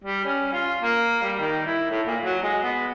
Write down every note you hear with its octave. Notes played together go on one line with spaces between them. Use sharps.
G3
C#4
F4
A#3
G3
D#3
E4
A2
A#2
F#3
G#3
B3